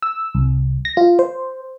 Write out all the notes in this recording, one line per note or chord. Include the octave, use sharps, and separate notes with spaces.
E6
C2
A#6
F4
C5